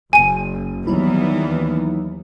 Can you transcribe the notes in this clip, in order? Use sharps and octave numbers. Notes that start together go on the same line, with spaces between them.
F#1 G#5 D#7
D#2 E3 F#3 G3 B3 D#4 E4